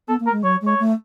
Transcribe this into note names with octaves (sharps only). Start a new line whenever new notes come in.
B3 A4
A#3
A#4
G#3
F#3 C#5
G#3
C#5
A3